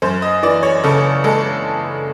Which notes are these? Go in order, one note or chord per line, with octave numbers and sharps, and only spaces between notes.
F#2 C5
D#5
E3 D5
C#5
C#3 A4
G#3 A4